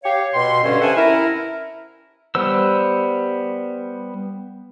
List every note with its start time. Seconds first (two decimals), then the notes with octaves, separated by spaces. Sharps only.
0.04 G4 C#5 F5
0.34 B2 C6
0.63 G2 D3 C#4
0.81 G2 C3 C#4 F#5 G#5 A5
0.96 E4 A#4
2.35 G3 B3 C5 E6